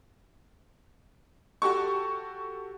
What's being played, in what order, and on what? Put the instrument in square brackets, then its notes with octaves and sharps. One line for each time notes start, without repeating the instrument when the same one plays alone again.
[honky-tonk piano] F#4 G4 A4 C#6